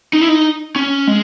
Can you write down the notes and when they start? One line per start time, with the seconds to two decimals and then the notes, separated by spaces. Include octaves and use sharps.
0.13 D#4
0.21 E4
0.28 D#4
0.76 C#4
1.07 G#3